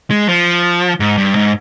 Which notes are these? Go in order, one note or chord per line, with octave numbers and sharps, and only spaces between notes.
G#3
F3
G#2
G2
G#2